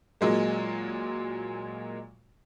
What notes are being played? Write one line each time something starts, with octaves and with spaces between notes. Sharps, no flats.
A#2 F#3 G#3 A#3